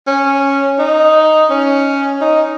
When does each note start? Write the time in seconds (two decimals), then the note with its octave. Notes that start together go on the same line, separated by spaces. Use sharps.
0.07 C#4
0.79 D#4
1.50 C#4
2.21 D#4